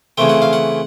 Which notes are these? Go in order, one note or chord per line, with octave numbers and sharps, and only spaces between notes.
C#3 E3 A3 C4 G5
F#5
F5
F#5